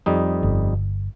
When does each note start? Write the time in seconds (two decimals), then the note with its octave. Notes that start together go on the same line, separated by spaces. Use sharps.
0.06 F2 G3 D#4
0.43 G1